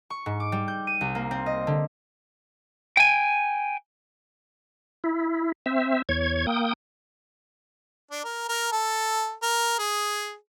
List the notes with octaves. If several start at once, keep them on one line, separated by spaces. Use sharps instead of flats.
C#6
G#2
D6
G3
G6
D#7
C2
A#3
C4
D#5
D3
G5 G#5
E4
C4 E5
E2 C#5 G#6
A#3 G5 D#6
D4
A#4
A#4
A4
A#4
G#4